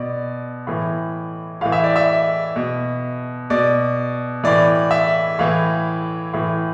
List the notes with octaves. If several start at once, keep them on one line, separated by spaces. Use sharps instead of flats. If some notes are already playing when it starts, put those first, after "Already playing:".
Already playing: B2 D5
A2 E3
A2 E3 F5
E5
D5
E5
B2
B2 D5
A2 E3 D5
E5
A2 E3 F5
A2 E3